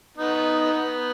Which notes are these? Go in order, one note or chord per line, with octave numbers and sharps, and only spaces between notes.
B3 D#4
B3